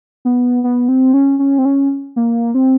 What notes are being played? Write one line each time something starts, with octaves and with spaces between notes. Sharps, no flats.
B3
B3
C4
C#4
C#4
C4
C#4
A#3
C4